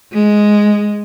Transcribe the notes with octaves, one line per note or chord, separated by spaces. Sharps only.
G#3